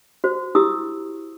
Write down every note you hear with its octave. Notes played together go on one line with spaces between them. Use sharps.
F#4 C5
E4 G4 D#6 E6